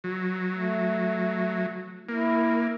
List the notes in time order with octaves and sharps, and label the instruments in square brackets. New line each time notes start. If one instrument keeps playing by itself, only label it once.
[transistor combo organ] F#3
[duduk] A3
[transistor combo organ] A#3 [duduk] E4